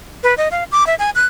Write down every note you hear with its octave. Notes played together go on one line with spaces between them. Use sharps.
B4
D#5
F5
D6
E5
G#5
F#6